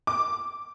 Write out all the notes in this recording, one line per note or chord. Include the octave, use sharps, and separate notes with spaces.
D6